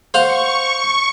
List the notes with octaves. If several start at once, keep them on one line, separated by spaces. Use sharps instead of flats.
C5 F5 F#5 C#6